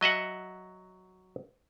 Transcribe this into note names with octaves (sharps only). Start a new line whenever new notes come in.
F#3 D#5 E5 F#5